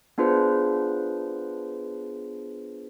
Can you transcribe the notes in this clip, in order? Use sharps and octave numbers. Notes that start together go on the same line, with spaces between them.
B3 D4 F4 G#4 B4 C5